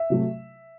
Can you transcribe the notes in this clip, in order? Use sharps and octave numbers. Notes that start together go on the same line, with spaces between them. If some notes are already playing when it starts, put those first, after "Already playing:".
Already playing: E5
C3 F#3 A3